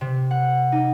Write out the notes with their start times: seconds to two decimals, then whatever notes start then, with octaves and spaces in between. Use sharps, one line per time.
0.01 C3
0.31 F#5
0.72 D#4